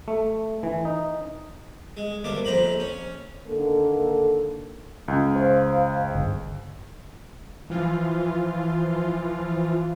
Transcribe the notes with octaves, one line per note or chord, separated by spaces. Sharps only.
A3
E3
D#4
G#3
D2 G2 A#3 D6
A#1 F2 C5 A#5 B5
C#4
D3 D#3 A#3 A4
C#2
C5 F5
G1
E3 F3 F4